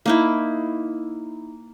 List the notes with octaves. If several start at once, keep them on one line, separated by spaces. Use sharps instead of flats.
A#3 D#4 E4